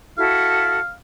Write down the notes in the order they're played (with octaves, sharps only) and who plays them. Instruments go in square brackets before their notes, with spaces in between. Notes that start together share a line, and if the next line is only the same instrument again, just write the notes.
[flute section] E4 F#4 A4 [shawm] F5